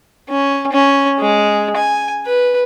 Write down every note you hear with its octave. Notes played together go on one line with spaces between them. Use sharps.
C#4
C#4
G#3
G#5
B4